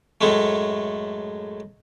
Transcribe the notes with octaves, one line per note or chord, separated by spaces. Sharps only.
F#2 A2 G#3 A3